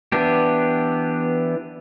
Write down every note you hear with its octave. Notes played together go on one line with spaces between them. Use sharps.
E3 B3 D4 G4